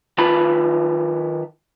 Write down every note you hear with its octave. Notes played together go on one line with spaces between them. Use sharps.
D#3 F4 B4 A5 B5